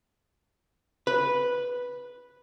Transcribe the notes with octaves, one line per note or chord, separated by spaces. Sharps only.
B4